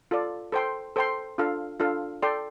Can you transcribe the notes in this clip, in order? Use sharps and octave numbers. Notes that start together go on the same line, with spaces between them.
F4 A4 D5
A4 C5 G5 C6
A4 C5 G5 C6
D4 F4 A4 F5
D4 F4 A4 F5
A4 D5 G5 C6